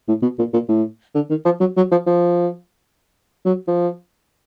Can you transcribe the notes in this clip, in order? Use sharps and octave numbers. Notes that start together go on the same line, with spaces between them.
A2
B2
A#2
A#2
A2
D3
D#3
F3
F#3
F#3
F3
F3
F#3
F3